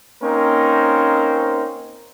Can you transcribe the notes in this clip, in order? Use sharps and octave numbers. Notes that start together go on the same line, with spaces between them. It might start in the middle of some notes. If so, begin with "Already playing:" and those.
A#3 C4 C#4 D#4 A#4 C5